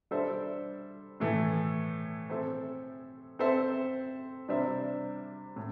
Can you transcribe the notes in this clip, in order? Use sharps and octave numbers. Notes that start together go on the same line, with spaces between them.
G3 D4 A4 C5 E5
A2 E3 A3
C4 A4 C5 E5
C4 A4 C5 E5
C3 G3 D4 C5 E5
A2